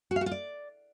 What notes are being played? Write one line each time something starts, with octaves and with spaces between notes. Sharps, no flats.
F#4
F5
F#4
F4
D5